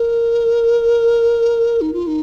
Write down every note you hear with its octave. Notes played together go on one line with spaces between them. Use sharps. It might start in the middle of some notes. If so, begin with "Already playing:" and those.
Already playing: A#4
D#4
F4
D#4